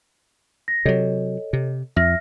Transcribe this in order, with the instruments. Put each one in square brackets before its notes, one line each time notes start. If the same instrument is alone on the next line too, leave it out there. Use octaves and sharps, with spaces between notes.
[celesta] A#6
[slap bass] C3 F#3 [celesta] A4 C#5 D#5
[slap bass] C3
[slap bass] F2 [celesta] E5 F6 A#6